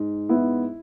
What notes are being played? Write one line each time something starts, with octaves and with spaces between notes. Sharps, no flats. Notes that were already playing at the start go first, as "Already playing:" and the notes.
Already playing: G#2
B3 E4